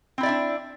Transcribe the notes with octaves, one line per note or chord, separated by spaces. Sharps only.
C4 D4 E4 D5 E5